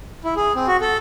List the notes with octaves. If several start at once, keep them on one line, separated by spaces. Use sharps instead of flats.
E4
G#4
C4
F#4
A4